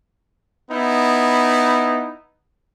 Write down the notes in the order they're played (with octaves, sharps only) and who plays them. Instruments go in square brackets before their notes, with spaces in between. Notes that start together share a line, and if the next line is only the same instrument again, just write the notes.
[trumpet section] B3 D#4 E4